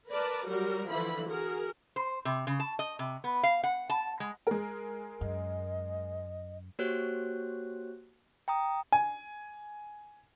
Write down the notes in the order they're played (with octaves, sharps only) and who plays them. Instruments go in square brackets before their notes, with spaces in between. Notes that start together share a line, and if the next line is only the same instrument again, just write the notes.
[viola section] A#4 B4 D5 A5
F#3 G3 F#4 A#4
D3 E3 F3 E4 B5
F#4 G#4 A#4
[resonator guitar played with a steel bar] C5
C3
C#3
A5
D#5
C3
B3
F5
F#5
A5
G#3
[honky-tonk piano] G#3 A#4
[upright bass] F#2 [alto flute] D#5
[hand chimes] A#3 F#4 G4 C5 C#5 F#6
G5 A#5 D#6
[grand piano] G#5